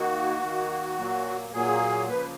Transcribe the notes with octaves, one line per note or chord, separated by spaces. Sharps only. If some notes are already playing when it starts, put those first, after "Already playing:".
Already playing: D#3 A#3 F#4
D#3 A#3
A#2 F#3 A#3
A#2 F#3 A#3 G#4
C#3 F3 A#3 B4